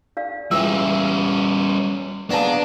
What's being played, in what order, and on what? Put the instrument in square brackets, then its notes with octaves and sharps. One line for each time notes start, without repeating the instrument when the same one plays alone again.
[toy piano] D5 F5
[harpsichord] C#2 E3 [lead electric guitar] G3 C#4 [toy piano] G5 E6
[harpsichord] C#3 A#3 B3 [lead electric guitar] D4 [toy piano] D#5 A5